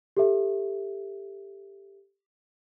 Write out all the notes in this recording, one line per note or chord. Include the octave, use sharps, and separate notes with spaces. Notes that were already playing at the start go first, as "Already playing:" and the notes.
G4 A4 E5